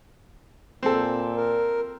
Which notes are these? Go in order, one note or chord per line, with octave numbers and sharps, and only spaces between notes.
A#2 C4 A4
A#4